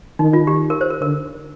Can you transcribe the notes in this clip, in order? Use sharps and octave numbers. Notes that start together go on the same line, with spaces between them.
D#3 D#4
F4
G4
A#4
C5
A#4
D3 A#4